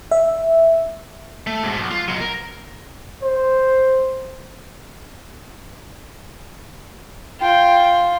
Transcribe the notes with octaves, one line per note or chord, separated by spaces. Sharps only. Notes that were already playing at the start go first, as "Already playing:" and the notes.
E5
A3
G#2 B2
B1
F4
B2 F#3
A#4
C5
F4 G5